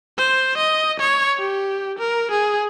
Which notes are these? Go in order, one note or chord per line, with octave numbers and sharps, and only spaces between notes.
C5
D#5
C#5
G4
A#4
G#4